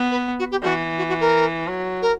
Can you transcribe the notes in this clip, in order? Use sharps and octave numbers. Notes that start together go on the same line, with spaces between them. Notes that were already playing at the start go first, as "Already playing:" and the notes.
Already playing: B3
B4
F#4
G4
E3 F#4
F#4
F#4
A#4
F#3
A#4